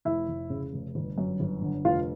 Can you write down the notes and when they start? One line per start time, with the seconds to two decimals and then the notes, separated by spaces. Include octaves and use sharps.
0.05 F1 E4 E5
0.29 F1
0.50 C#3
0.73 F1
0.95 G1
1.18 F#2
1.40 G1
1.62 D3
1.85 F1 F4 F5